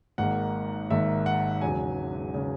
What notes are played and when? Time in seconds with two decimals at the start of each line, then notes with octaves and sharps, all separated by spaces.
0.18 G#1 G#2 D#3 A#3 F#5
0.90 G#1 G#2 D#3 A#3 E5
1.26 F#5
1.61 E1 E2 C#3 F#3 G#5
2.34 C#3 F#3